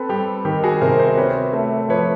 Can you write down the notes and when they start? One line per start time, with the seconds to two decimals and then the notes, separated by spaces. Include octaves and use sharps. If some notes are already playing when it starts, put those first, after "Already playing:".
Already playing: C4 A4 B4
0.09 G3 G4
0.45 D#3 G4
0.64 F#4 G#4
0.81 C3 A#4 C5
0.99 A#4 C5
1.17 C4 B4 C#5
1.53 A3
1.89 F3 B4 C#5